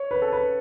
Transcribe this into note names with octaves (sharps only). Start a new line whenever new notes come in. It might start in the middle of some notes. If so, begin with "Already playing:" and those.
Already playing: C#5
B4
A4
B4